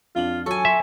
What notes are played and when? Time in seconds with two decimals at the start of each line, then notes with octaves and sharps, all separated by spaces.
0.15 F2 D4 F4 F#7
0.46 F#3 A4 G#5 C#6
0.65 E5 C6